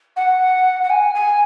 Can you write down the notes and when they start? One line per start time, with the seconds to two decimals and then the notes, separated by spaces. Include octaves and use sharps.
0.16 F#5
0.83 F#5
0.90 G#5
1.15 G#5